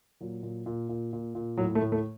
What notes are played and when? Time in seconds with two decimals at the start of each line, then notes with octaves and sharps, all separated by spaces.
0.21 A#2 F#3
0.43 A#2
0.66 A#2
0.89 A#2
1.13 A#2
1.35 A#2
1.58 A2 F#3
1.75 A3
1.82 A2
1.92 A3